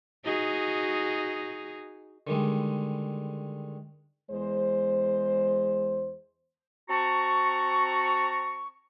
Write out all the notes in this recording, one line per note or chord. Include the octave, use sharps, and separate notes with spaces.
D#4 F#4 G#4
D3 D#3 G3 G#3
E2 G#3 C5
C4 F#4 A5 A#5 C#6